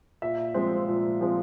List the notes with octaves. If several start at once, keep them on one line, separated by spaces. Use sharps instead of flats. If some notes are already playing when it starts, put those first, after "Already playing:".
A#2 E5
F3 G#3 C4
A#2
F3 G#3 C4